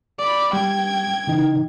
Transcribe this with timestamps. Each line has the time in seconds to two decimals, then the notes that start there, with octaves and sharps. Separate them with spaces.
0.19 D5 B5
0.53 G3 G5 G#6
1.27 C#3 E3 D#4